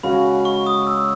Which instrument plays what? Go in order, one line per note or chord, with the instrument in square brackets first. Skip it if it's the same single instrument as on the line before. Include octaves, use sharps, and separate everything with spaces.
[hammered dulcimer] C#3 G#3 C#4 F#4 [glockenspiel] B5
[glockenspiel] C#6
D#6
E6